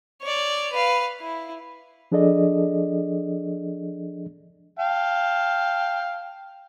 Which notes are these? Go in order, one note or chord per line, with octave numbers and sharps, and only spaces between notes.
C#5 D5
B4 F5
E4
F3 D4 G#4 A4 D5 D#5
F5 G5 A5